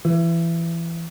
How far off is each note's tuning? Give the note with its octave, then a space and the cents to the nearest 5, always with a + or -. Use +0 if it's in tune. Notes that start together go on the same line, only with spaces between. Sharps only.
E3 +25